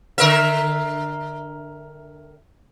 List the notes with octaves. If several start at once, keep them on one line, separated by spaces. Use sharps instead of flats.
D3 A#4 E5